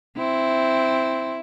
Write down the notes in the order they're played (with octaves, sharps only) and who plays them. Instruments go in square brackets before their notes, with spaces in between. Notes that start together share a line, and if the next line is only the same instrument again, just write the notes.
[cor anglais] C4 [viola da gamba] E4